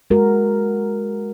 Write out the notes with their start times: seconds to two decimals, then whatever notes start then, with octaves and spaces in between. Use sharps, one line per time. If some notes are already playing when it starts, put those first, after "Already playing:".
0.10 G#3 F#4 A#4